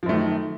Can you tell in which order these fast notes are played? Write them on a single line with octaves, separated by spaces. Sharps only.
F3 F#2 A3 D#3